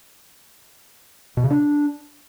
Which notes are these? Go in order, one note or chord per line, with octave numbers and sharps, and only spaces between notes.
B2
C#3
D4